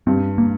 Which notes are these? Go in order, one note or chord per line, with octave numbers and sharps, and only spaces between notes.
G2 C4
A#3